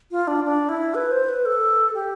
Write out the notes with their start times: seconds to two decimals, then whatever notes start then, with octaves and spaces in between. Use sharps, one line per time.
0.11 F4
0.27 D4
0.44 D4
0.69 E4
0.94 B4
1.11 C5
1.29 B4
1.45 A4
1.94 G4